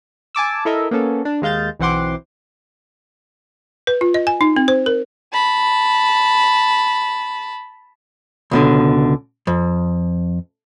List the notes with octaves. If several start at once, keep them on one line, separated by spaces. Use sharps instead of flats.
G#5 A5 D6 E6
E4 A4 A#4 D#5 E5
A#3 B3 C#4 A4
D4
D#2 G#3 F5 G6 A6
B1 E3 C4 F#5 C6 D6
B4
F4
D#5
G#5
D#4
C4
C5
A#4
A5 B5
C#2 B2 D3
F2